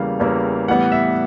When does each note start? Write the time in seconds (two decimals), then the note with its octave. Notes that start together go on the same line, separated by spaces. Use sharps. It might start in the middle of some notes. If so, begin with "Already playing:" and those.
Already playing: E2 C#3 E3 G3 A#3 F5
0.20 E2 C#3 E3 G3 A#3
0.68 A2 E3 G3 B3 F#5
0.92 E5